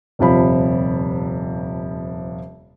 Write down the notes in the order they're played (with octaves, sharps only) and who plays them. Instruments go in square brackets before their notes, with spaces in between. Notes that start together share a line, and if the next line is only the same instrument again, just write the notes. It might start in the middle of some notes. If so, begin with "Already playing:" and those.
[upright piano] D#1 F2 C3 F3 B5